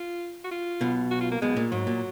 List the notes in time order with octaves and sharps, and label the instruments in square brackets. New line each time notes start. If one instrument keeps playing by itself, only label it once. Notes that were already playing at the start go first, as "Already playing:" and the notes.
Already playing: [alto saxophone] F4
F#4
F4
[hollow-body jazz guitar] B1 B2
[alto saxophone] F#4
F4
A#3
[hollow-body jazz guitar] B1 B2 [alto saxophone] G#3
[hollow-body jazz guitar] A#2
[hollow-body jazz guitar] G#2 [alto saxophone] F#3
[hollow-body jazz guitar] A#2